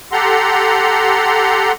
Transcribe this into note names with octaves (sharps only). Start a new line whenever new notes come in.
G4 A4 F#5 A#5 C6